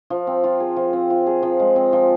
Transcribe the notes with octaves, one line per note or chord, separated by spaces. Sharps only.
F3
C4
F4
G#4
F3
C4
F4
G#4
F3
G#3
C4
F3